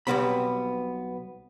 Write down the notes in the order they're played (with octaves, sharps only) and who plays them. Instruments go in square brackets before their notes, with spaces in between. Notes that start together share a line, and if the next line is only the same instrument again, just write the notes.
[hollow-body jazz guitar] B1 G2 G3 B3 C4 B5